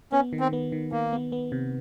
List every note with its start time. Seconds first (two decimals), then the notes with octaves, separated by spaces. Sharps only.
0.12 B3 C#4
0.33 D#3
0.40 C4
0.53 B3
0.72 D#3
0.92 D#3 A#3
1.13 B3
1.32 B3
1.52 C3